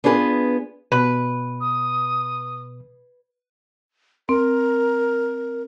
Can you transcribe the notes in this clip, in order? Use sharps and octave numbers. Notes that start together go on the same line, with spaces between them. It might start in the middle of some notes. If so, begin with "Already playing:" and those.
B3 D4 F4 G#4 A#4 B4
B2 B4
D#6
C4 A#4